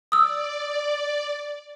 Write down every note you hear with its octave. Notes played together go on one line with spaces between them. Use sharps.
D5 D#6 E6